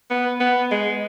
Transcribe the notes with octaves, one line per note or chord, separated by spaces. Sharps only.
B3
B3
G#3